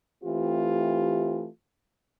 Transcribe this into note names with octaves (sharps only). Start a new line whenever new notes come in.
E3 A3 C4 F4 G4